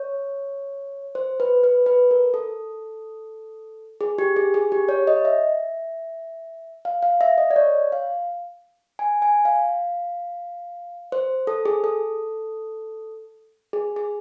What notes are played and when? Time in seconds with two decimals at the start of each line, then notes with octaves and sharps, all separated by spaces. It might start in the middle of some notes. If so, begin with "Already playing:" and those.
Already playing: C#5
1.15 C5
1.40 B4
1.64 B4
1.86 B4
2.11 A#4
2.34 A4
4.01 G#4
4.18 G4
4.36 G#4
4.54 G#4
4.72 G4
4.89 C#5
5.07 D#5
5.25 E5
6.85 F5
7.02 F5
7.21 E5
7.38 D#5
7.51 D5
7.56 C#5
7.92 F5
8.99 G#5
9.22 G#5
9.45 F5
11.12 C5
11.47 A4
11.65 G#4
11.84 A4
13.73 G#4
13.96 G#4